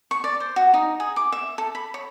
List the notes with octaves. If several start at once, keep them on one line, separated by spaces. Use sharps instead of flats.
C#6
D5
C5
F#4
D#4
G#4
D6
E5
A4
B5
C#5